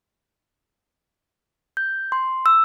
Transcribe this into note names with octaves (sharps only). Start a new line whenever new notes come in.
G6
C6
E6